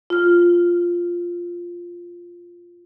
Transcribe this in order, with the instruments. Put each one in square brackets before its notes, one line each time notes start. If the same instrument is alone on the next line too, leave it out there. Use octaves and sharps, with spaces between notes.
[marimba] F4 F6